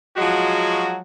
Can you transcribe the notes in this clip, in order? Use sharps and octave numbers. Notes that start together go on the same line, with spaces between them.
F3 F#3 G#3 F#4